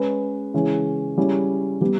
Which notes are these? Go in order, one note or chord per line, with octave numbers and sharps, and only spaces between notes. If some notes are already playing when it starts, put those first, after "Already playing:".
Already playing: G#3 C#4 G#4 B4
C#3 E3 G#3 C#4
G3 C#4 E4 G#4
G3 B3 G4